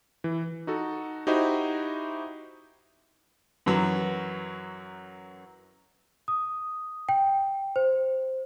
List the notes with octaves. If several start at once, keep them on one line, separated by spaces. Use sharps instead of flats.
E3
D#4 F#4 A4
D#4 E4 F#4 G4 C5 D#5
F#2 E3 F#3
D#6
G5
C5